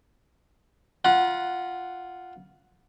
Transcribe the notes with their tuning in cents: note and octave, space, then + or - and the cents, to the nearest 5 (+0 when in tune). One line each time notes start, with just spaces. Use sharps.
F4 +0 F#5 +0 B5 -45